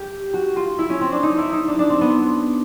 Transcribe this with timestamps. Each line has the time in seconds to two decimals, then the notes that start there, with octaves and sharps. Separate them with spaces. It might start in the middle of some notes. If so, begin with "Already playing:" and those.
Already playing: G4
0.33 F#4
0.56 F4
0.78 E4
0.89 C#4
1.01 C4
1.12 D4
1.23 D#4
1.38 E4
1.53 D#4
1.68 D4
1.79 D4
1.90 C4
2.01 B3